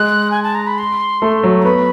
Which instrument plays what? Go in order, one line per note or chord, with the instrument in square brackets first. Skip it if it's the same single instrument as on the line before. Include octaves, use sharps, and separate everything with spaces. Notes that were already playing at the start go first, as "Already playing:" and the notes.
Already playing: [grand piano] G#3 [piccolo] F#6
[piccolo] G#5
A5
A#5
B5
C6
[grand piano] A3
F#3
[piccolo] A#5
[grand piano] B3 [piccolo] B5